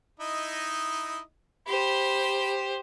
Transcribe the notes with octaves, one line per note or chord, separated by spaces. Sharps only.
D#4 E4 D#5
G4 C5 B5